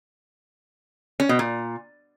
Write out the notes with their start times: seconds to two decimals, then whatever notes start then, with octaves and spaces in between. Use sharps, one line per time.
1.20 C#4
1.29 B2
1.39 A#2